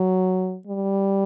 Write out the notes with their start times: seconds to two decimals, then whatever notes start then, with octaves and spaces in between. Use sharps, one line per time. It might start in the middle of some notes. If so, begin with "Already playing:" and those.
Already playing: F#3
0.67 G3